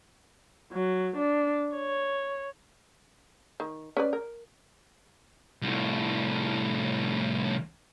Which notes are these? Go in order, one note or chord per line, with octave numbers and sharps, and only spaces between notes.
F#3
D4
C#5
D#3
C#4 B4 D5
A#4
C2 A2